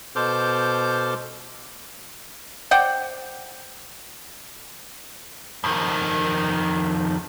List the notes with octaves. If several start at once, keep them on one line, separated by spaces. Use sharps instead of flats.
B2 A4 C5 D6 F6 G6
C5 D5 F#5 G5
F2 D#3